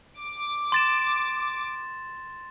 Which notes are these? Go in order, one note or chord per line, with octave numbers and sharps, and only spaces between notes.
D6
C6 A6 E7